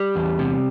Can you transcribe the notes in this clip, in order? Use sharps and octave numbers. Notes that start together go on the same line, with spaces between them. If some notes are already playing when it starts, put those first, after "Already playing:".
Already playing: G3
E2
C3